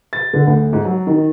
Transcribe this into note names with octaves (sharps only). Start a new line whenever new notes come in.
A6
D3
D2
G#2
F#3
D#3